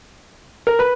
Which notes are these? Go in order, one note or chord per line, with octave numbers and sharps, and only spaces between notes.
A#4
B4